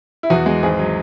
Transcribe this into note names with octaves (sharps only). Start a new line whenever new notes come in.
E4
E2 F#4
G#3
G#1 G#4
F#3